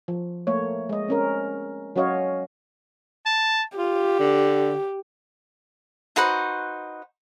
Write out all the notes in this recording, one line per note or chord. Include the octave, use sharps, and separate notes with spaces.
F3
A3 A#3 C#5
G#3 D#5
C4 C#4 A#4
F#3 C#4 F#4 C#5 D#5 F5
A5
F4 G4
D3
D#4 F#4 B4 C5